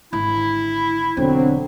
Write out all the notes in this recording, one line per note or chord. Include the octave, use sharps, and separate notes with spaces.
G#1 D3 E4
E1 E2 D3 F#3 C4